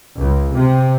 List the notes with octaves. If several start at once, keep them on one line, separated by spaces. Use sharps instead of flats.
C#2
C3